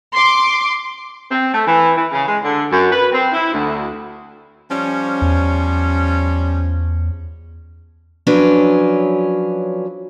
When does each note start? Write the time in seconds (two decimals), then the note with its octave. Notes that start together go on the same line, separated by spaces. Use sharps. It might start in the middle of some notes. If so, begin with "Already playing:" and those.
0.13 C6 D6
1.31 C4
1.53 A3
1.66 E3
1.96 E3
2.11 C#3
2.27 G#3
2.43 D3
2.70 F#2
2.91 B4
3.12 C4
3.32 E4
3.52 D2
4.70 F3 G3 C#4
5.22 E2
8.27 F3 F#3 C#4 D4 B4